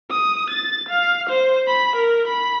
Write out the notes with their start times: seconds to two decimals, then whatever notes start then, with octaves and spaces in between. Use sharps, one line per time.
0.10 D#6
0.50 A6
0.89 F5
1.29 C5
1.67 B5
1.96 A#4
2.27 B5